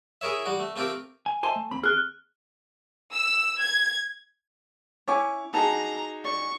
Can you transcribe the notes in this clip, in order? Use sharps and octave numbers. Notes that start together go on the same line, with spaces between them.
E4 G#4 A#4 C#5 E5
G3 F#4
A3
A3 C4 F4 G4 A#4
G#5
C5 D#5 E5 G#5 A5 C6
A3
D#2 C4 B5
G#4 F6 F#6
E6
G#6
C#4 E4 C#5 G#5 C#6 D6
D#4 F#4 G#4 A5 A#5
D5 C#6